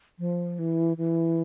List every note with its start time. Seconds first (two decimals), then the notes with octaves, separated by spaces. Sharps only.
0.19 F3
0.59 E3
0.97 E3